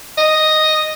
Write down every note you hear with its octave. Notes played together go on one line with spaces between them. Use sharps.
D#5